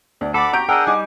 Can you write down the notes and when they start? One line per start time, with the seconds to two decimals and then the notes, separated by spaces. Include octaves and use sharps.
0.21 D2 D5
0.34 A4 D5 F#5 B5 D6
0.53 F#4 G4 A#5 G6 D7
0.69 D4 G#4 A#4 D#5 F#5 G5 E6
0.87 G3 D#4 G#5 D6